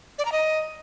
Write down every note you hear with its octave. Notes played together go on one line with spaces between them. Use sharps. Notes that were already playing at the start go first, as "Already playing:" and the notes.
D5
A#5
D#5